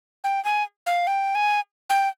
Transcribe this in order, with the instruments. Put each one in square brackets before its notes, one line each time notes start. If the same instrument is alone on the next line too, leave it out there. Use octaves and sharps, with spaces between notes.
[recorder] G5
G#5
F5
G5
G#5
G5